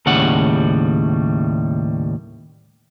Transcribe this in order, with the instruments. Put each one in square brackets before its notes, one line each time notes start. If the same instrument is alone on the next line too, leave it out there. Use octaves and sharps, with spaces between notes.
[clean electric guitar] D#2 A2 C#3 G3 F#5